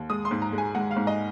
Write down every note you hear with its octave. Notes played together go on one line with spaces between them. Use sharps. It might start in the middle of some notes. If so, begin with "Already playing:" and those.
Already playing: D#2
G#3 D#6
C6
G#2
A#5
G#3
G#5
G#3 F#5
F5
G#2
D#5